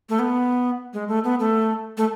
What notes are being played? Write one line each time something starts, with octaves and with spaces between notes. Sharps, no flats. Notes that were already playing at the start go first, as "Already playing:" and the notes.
A3
B3
G#3
A3
B3
A3
A3